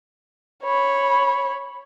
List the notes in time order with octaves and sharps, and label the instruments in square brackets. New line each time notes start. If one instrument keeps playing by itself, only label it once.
[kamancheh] C#5 B5